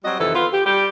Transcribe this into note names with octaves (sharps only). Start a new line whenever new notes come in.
F#3 G3 C4 F#4 D#5
F2 C3 D#3 E3 A4
B3 F4
G4
G3 G4